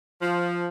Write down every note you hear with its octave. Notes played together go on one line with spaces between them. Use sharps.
F3